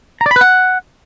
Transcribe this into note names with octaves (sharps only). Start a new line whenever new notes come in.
A#5
D5
B5
B4
F#5